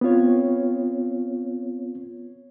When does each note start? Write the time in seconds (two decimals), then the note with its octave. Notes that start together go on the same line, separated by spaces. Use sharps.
0.01 B3 C4 F4 C#5